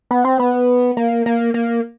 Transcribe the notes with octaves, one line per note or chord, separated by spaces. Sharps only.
B3
C4
B3
A#3
A#3
A#3